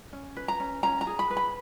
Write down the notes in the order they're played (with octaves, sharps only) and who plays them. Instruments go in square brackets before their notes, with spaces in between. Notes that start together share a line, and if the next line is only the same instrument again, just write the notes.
[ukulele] C#4
B4
A#5
C#4
C#4 A#5
A#5
G#4
B5
B4
B5